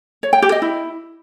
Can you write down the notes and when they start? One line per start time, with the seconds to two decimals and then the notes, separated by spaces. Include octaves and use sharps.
0.23 C#5
0.33 G5
0.42 G4
0.52 D#5
0.62 E4